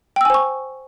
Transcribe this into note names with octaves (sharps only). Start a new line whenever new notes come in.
C5 G5 G#5 C#6 E6